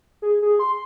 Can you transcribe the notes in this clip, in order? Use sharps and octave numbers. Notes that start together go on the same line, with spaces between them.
G#4
G#4
C6